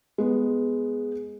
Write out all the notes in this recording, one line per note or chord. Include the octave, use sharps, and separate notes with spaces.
G#3 B3